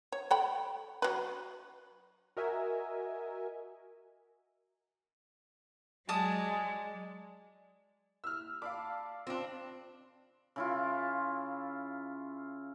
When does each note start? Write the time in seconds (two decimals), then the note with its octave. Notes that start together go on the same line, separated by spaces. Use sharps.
0.12 C#5
0.31 A4 G5 B5
1.02 F#3 B4
2.37 F#4 A#4 D#5 E5 G#5
6.09 F#3 G#3 D5 A5 D#6
8.24 E5 E6 F6
8.62 D5 F5 A5 B5 D6
9.27 C4 D4 F4 B5
10.56 C#3 E4 F4